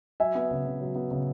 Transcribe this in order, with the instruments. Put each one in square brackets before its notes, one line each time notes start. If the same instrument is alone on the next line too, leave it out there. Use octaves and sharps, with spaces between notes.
[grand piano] F#3 E5 G#5
B3
C#3
C#3
F#3
B3
C#3